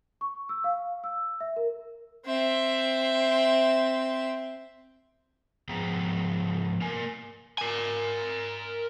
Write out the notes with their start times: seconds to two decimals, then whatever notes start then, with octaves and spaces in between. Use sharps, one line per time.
0.21 C#6
0.49 E6
0.64 F5
1.04 E6
1.40 E5
1.56 A#4
2.26 C4 E5
5.69 G#2 F3 B3 G#4 G5 A#5
6.81 A#3 A#4 G#5
7.58 A#4 G#5